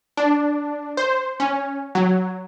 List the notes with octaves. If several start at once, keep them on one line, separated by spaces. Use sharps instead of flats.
D4
C5
C#4
F#3